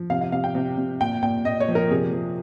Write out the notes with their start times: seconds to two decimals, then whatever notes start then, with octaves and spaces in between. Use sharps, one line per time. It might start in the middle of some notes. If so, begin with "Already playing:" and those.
Already playing: F3
0.10 C3 F5
0.21 F5
0.32 C3 F5
0.44 G5
0.55 C3
0.77 C3
1.01 A#2 G5
1.23 A#2 G5
1.45 A#2 D#5
1.60 C#5
1.68 F3
1.75 A#4
1.90 C3 G#4
2.12 F3